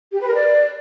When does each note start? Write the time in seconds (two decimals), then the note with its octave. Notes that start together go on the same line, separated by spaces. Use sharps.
0.13 G4
0.20 B4
0.27 A#4
0.33 D5